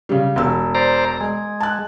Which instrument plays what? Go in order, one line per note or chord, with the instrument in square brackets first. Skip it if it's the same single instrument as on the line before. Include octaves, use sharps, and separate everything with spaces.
[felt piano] C#3 G3
E1 E6
[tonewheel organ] C5 D5 A#5
G#3
[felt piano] A5 F#6